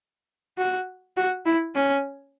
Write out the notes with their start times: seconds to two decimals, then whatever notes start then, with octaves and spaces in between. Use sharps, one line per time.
0.58 F#4
1.17 F#4
1.46 E4
1.75 C#4